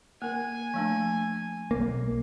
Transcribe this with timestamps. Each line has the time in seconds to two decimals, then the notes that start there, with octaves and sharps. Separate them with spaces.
0.22 A#3 A#4 G#5
0.74 F3 A3 D4
1.71 B1 A#3